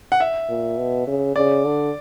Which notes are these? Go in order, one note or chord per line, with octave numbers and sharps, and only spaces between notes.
F#5
E5
A#2
B2
C#3
C#3 D5
D3